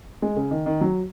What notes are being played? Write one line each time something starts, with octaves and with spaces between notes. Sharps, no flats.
G#3
C#3
D#3
D#3
F#3